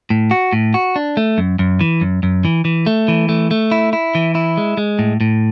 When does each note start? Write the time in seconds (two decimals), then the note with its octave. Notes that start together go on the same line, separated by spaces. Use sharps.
0.10 A2
0.31 F#4
0.53 A2
0.74 F#4
0.96 D4
1.17 A3
1.38 F#2
1.59 F#2
1.81 E3
2.01 F#2
2.23 F#2
2.45 E3
2.65 E3
2.86 A3
3.08 E3
3.29 A3
3.51 A3
3.72 E4
3.93 E4
4.15 E3
4.35 E4
4.57 G#3
4.77 G#3
4.99 A2
5.21 A2